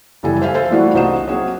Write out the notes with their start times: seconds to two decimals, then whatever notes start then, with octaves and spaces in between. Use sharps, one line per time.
0.23 F#1 E3 G3 A4 G#5
0.42 C5 E5 F5 G#5
0.54 A4 C5 F5
0.70 E3 G3 A3 D4 F4 F#4
0.94 C2 D#4 F#4 C5 D#5 E7
1.27 F#3 A#3 C4 D#4 G#4 C#5